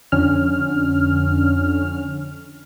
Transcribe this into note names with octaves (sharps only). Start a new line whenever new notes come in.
F2 D3 C#4 F6